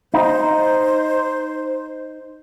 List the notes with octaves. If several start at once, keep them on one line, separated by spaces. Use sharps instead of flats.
D#4 C5